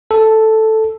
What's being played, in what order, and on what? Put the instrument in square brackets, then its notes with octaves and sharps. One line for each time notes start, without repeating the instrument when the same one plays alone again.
[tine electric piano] A4